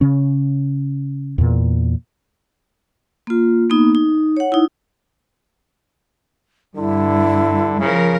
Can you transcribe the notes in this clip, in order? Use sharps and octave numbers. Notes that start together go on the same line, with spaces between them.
C#3 C#4
E2 A#2
A#3 F4
A#3 B3 D#4
D#4
C#5 F#5
D#4 E4
G2 D3 E4
C#3 F3 A#4